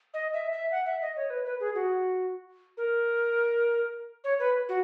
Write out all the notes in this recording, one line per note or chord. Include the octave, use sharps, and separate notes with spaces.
D#5
E5
E5
F#5
E5
D#5
C#5
B4
B4
G#4
F#4
A#4
C#5
B4
F#4